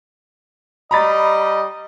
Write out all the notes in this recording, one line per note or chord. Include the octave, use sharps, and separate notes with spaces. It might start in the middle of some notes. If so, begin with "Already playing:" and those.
G3 D#5 A#5 B5 A6